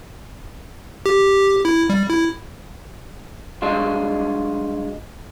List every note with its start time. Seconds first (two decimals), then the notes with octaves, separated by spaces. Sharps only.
1.06 G4
1.65 E4
1.90 G3
2.10 E4
3.62 G2 F#3 G#3 D4 F4